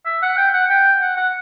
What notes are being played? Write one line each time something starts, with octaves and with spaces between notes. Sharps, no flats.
E5
F#5
G5
F#5
G5
F#5
F#5